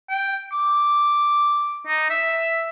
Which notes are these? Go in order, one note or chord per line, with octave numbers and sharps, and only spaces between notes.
G5
D6
D#4
E5